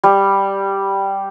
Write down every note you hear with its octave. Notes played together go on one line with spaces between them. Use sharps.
G3